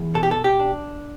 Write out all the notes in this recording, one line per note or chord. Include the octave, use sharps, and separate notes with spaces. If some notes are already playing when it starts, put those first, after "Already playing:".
Already playing: E2
B2 A4
G4
A4
G4
D4